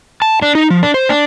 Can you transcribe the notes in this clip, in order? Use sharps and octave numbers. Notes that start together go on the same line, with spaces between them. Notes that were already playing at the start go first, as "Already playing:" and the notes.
A5
D4
D#4
F3
D4
C5
D4